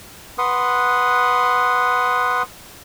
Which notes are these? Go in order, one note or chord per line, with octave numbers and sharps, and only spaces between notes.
B4 F#5 C6 D#6